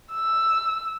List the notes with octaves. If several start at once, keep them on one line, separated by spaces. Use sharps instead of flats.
E6